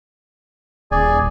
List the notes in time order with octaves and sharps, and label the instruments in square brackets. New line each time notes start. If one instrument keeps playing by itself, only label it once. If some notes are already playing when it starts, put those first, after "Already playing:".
[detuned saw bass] D#1 [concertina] G#4 D5 G#5